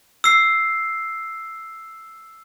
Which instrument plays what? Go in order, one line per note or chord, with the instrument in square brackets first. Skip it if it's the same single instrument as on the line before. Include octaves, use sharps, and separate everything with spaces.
[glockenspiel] E6 C7